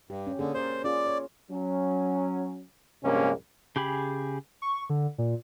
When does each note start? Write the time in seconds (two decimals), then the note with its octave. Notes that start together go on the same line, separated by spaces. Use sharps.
0.10 G2 G4
0.27 C#4
0.39 D3 A#3 C#4 G#4
0.54 A#4 C5 D5
0.84 C#4 F4 G#4 D5
1.07 C#5
1.51 F#3 C#4
3.02 A#1 G2 C3 G#3 A#3 C#4
3.76 C#3 G4 G#4 B5
4.62 C#6
4.90 D3
5.18 A#2